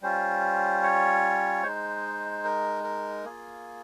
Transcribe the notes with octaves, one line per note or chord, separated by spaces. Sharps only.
G3 C#4 F4 C5
C#5
G#3 D#4 C5
A#4
A#4
A#3 F4 G#4